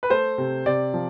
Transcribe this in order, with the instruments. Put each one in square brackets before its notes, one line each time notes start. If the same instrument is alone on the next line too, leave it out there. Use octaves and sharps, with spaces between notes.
[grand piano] B4
A3 C5
C3
C3 D5
F3